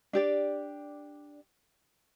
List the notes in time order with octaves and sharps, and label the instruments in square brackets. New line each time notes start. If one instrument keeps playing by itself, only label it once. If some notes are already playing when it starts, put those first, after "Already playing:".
[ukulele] D4 G4 D5